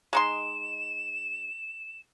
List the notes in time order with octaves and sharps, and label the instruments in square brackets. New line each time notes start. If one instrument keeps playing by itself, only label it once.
[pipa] G#3 D#4 C6 [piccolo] E7